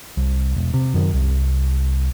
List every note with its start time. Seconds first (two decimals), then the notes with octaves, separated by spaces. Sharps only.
0.17 C2
0.56 E1
0.74 C3
0.94 F#2 D#3
1.14 C2